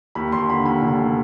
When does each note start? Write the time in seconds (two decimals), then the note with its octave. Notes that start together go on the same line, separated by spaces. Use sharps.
0.15 D#2 B5
0.32 D#2 C6
0.49 D3 B5
0.66 D#2 B5
0.82 F1